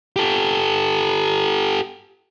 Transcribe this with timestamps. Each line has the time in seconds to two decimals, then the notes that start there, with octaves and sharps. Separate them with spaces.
0.16 G4 A4